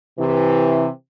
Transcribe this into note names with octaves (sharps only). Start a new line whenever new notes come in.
C3 E3